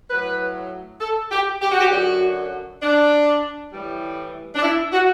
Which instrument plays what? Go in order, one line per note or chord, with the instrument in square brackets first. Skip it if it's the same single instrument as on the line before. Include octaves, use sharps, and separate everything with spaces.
[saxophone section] A2 F#3 B4
A4
G4
G4
F#4
G4
F#2 D3 F#3 F#4
D4
A2 E3 G3
D4
E4
F#4